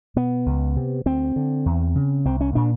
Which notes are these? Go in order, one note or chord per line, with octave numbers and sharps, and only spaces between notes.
B2 B3
C#2
C3
D2 C4
D3
E2
C#3
C2 C4
C#4
A#2 D4